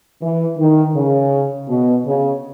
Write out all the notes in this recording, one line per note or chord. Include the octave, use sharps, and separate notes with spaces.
E3
D#3
C#3
B2
C#3